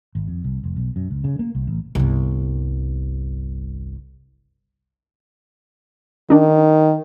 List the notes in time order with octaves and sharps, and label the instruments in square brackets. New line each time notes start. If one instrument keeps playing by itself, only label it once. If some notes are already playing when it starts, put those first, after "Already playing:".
[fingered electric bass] G#1
F2
C2
F1
B1
F#2
C#2
C#3
A#3
C2
A1
[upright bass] G1 C2
[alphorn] D#3 [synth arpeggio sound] D4 D#4